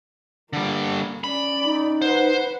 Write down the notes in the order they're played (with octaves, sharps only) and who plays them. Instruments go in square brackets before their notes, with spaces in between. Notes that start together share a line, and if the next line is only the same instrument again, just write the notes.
[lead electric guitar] D3 G3 [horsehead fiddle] A#3
[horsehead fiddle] C#4 D5 [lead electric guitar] B5
[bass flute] D#4
[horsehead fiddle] B4 F#5 [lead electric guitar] C5